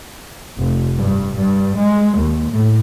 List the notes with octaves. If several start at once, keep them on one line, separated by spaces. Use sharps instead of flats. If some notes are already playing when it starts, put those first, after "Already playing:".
F1
G2
G2
G#3
D#2
A2